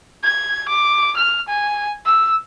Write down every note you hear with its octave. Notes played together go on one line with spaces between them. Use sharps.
G#6
D6
F6
G#5
E6